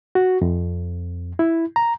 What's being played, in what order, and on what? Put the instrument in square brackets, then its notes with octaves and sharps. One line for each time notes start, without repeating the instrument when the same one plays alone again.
[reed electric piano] F#4
F2
E4
A#5